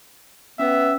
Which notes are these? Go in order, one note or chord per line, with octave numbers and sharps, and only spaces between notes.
B3 C#4 E5 E6